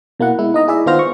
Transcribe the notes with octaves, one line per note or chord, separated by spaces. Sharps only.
B2 A#3 E4 F#5
G#3 E4
D#4 D#5 A#5
E4 G#4 D5 E5
D#3 B3 F4 C5 F6 A#6
C#6